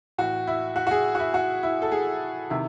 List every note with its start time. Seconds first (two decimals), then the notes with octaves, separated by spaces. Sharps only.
0.18 A2 E3 F#4
0.47 E4
0.76 F#4
0.87 F#4
0.91 G#4
1.15 F#4
1.20 E4
1.34 F#4
1.63 E4
1.82 A4
1.92 G#4
2.50 C3 D#3 E4